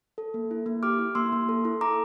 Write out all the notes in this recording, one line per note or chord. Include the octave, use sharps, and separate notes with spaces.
A4
A#3
E4
A#3
G4 D6 F6
E4
A#3 C6 E6
A#3
A4
E4
A4 A#5 D6